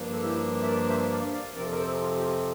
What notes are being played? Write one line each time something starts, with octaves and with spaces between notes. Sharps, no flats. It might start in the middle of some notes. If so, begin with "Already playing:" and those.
Already playing: G2 F3 A#3 D4
A4
E4 G4
E5
A#4 D5
C5 E5
D5 F5
D5 F5
F2 C3 F3 C4 A#4 D5
A#4
A4 C5
F4
G4
F4